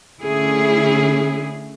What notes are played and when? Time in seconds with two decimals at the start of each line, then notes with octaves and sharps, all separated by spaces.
0.21 D3 A3 C#4 E4 G#4